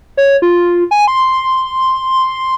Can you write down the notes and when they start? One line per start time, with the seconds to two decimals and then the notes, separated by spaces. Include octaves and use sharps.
0.17 C#5
0.42 F4
0.91 G#5
1.08 C6